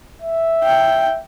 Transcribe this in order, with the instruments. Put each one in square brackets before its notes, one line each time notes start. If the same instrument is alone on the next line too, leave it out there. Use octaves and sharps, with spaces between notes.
[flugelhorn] E5
[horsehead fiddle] G5